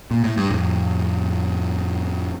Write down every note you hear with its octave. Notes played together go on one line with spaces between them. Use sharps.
A#2
A2
G2
F2 A2